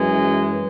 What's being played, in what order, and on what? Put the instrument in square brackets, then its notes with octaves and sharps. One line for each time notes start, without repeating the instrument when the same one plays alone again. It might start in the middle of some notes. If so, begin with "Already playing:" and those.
Already playing: [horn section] F#2 E3 G#3